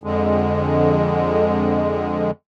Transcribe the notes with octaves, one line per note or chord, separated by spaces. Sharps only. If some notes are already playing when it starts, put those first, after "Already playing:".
F2 D3 G#3